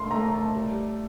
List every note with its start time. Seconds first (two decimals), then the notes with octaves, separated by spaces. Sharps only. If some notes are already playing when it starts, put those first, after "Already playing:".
Already playing: A3 C6
0.11 A3 A#5
0.34 A5
0.55 G3